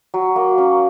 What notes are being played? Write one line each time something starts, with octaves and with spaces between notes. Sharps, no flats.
F#3
A#3
C#4